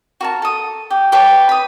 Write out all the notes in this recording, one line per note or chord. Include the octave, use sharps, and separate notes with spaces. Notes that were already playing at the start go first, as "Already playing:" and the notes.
F#4 A#4 A5
A4 D#6
G4
G4 B4 C#5 A5
B5 D#6